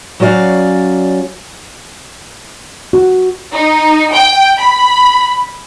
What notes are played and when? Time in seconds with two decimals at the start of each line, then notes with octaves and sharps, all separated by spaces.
0.20 F#3 C#4 F#4 D5 F5
2.93 F#4
3.54 D#4
4.12 G5
4.58 B5